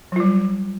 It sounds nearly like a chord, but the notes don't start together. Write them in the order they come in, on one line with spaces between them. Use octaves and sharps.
F#3 F4 G3